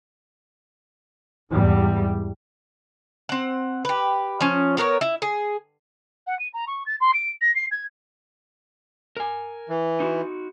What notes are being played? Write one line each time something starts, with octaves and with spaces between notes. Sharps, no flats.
E2 G#2 G3
C4 F#5
G4 B4
F3 C#4
B3 A#4 C5 C#5
E4
G#4
F#5
D#7
A#5
C#6
A6
C6
D7
A#6
C7
G#6
A#4 G#5
E3
D#4 F#4